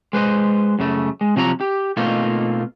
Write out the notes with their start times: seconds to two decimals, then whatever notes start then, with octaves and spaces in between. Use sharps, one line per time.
0.13 G#3 B4 C5 D#5
0.79 F#2 C#3 A3
1.21 G#3
1.36 C3 F3 F#3 D#5 A#5
1.61 G4
1.97 B2 A3 A#3 C4 D#4 F4